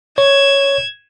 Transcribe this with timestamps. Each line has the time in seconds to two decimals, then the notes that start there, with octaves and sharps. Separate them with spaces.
0.18 C#5 G#6 E7